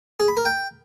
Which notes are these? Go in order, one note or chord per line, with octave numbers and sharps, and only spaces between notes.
G#4
B5
A#4
G5